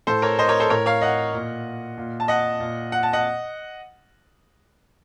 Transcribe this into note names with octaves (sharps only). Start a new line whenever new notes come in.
A2 A4 C5
A#4 C#5
C5 D#5
A#4 C#5
A4 C5
A2 A#4 C#5
C#5 F5
D#5 F#5
A#2
A#2
A5
D#5 F#5
A#2
F#5
A5
D#5 F#5